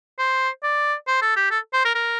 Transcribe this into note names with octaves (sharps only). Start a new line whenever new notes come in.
C5
D5
C5
A4
G4
A4
C5
A#4
A#4